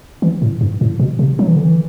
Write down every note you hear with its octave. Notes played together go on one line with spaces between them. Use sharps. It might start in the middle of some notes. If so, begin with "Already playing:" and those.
E3
A2
G2
A2
B2
C3
F#3
E3
D3
E3